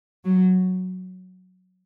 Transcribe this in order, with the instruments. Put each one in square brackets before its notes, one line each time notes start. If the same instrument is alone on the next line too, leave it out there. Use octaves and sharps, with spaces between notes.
[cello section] F#3